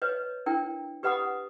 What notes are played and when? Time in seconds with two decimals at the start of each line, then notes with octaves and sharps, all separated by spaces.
0.02 B4 C#5 D#5
0.46 D4 E4 A#4 G5
1.03 G4 B4 D#5 F#5 B5 D#6